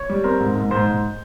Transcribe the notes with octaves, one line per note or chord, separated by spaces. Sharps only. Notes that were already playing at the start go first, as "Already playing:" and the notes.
Already playing: C#5
G3
C4 A#4
G#2
G#2
G#2 C5
G#2